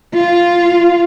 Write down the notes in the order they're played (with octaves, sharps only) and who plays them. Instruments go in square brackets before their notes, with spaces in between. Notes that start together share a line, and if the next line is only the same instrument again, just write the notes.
[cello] F4